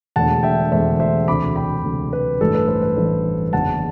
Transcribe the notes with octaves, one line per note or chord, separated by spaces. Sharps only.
E1 E2 D3 A3 F#5 A5
E5 G5
E1 E2 D3 A3 C5 E5
C5 E5
E1 D2 C3 B5 D6
G5 B5
E1 D2 C3
B4
A1 G2 E3 A3 A4
B4
A4 C5
B4
A1 G2 E3 A3
F#1 E2 D3 F#5 A5